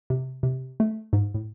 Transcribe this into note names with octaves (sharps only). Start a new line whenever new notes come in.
C3
C3
A3
G#2
A2